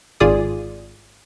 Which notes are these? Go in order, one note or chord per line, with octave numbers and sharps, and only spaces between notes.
G#1 F4 G#4 D5 D#6